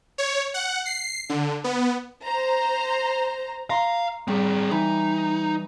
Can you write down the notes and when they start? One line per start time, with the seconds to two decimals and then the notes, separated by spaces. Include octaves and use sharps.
0.18 C#5
0.54 F#5
0.86 C7
1.29 D3
1.64 B3
2.23 C5 A#5
3.70 F5 A#5 C6
4.28 G3 C4 G#4
4.71 E3 D#4